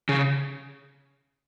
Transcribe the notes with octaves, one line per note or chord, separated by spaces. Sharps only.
C#3